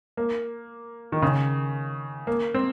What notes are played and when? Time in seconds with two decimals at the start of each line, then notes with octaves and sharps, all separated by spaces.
0.17 A#3
1.12 D#3
1.22 C#3
2.27 A#3
2.54 C4